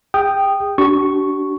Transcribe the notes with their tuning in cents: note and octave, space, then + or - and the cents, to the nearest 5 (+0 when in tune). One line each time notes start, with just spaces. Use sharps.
G#4 -45 G5 +0 D#6 -15
D4 -20 F#4 +45 C#6 +0